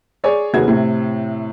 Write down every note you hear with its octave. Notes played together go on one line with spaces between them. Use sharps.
G#4 C#5 D5 G#5
F1 D#2 F#4 G#4 B4 G#6
A2 C3